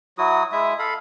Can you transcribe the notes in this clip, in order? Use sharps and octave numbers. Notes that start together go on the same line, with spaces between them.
F#3 E4 F#4 D#6
G#3 E4 E5 D#6
A4 F5 B5